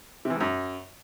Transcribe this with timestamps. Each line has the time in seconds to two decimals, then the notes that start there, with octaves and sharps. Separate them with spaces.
0.25 C3
0.30 E3
0.35 G#2
0.40 F#2